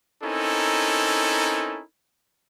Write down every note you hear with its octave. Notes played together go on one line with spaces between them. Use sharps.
C4 C#4 D#4 E4 A4 A#4